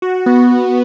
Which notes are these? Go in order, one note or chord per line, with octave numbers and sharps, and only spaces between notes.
F#4
B3